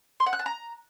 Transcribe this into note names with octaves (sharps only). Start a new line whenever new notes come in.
C6
F#5
F#6
A5
A#5